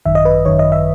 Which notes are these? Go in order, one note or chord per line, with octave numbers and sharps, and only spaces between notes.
G#1 F#2 D#3 E5
D#5
B4
G#1 F#2 D#3 C#5
D#5
E5